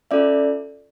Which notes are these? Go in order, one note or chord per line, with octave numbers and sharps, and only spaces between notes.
C#4 F4 A4 D5 E5